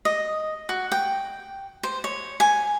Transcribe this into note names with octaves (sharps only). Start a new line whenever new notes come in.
D#5
F#4
G5
C5
C#5
G#5